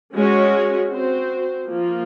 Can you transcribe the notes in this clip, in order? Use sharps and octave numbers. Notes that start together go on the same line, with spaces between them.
G#3 C#4 F#4 C#5
C4 F#4 C5
F3 A#3 F4